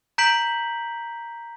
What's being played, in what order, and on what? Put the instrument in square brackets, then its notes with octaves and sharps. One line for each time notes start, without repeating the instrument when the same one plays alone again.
[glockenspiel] A#5 G6 B6 D7 F#7